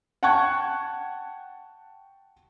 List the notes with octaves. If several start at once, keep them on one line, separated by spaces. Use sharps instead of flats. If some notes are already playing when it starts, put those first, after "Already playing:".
F#5 G5 A5 C#6 F#6 G#6